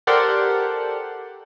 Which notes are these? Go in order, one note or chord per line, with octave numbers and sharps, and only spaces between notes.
G4 A4 A#4 C5 D5 F#5